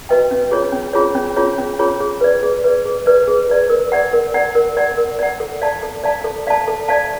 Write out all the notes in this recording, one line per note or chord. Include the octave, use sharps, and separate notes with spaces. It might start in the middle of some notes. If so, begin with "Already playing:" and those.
F#4 B4 D#5 G5
C#4
F4 G#4 C#5
C#4
F4 G#4 C#5
C#4
F4 G#4 C#5
C#4
F4 G#4 C#5
G#4
B4 D5
G#4
B4 D5
G#4
B4 D5
G#4
B4 D5
A#4
D5 F#5
A#4
D5 F#5
A#4
D5 F#5
A#4
D5 F#5
A4
D5 F5 A5
A4
D5 F5 A5
A4
D5 F5 A5
A4
D5 F5 A5